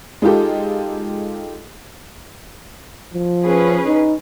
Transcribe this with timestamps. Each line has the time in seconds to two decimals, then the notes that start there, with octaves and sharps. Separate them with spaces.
0.22 G#3 D#4 F4 G4 A4
3.13 F3
3.45 C#4 G#4 B4
3.85 D#4